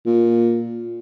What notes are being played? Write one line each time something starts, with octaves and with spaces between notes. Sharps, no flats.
A#2